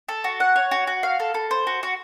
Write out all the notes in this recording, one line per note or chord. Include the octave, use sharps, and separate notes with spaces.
A4
F#4
F#5
C#5
F#4
F#4
F5
A4
A4
C5
F#4
F#4